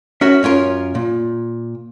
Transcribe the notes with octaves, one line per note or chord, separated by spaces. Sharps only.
C#4 F#4 A#4 E5
F#2 C#4 F4 A#4
A#2